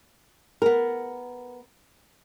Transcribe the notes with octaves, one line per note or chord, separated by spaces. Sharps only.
B3 A#4